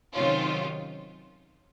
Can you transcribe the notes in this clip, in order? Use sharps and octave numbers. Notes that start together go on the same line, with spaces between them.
C3 D#3 F#3 C#4 F4